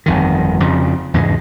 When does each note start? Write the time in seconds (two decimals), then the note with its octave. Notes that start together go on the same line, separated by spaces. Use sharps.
0.06 G1 F2 D#3
0.60 F2 C#3 F3
1.14 E2 G#2 C#3 G#3